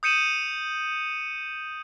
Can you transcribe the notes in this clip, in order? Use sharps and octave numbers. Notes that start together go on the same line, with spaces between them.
D#6 G6 C#7 D#7 E7 F#7